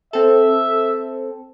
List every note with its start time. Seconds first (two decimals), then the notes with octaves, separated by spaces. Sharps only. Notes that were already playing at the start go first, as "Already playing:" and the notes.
0.13 C4 A4 E5